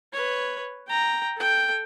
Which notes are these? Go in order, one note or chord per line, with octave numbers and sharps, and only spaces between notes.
B4 C#5
G5 A#5
A4 G5